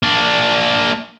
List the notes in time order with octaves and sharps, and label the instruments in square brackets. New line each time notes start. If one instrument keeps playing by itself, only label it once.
[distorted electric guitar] A#3 D4